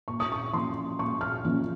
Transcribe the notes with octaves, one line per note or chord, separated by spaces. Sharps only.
A#2 C#6
D#6
C#6
F3 A#3 C#4 C6
A#2 C#6
F6
F3 A#3 C#4